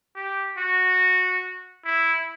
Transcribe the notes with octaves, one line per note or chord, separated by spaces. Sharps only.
G4
F#4
E4